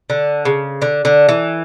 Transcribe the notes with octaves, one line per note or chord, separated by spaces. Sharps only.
D3
C#3
D3
D3
E3